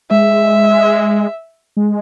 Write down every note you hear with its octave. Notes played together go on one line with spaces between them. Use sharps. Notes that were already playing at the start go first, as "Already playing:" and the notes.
G#3 E5
G#3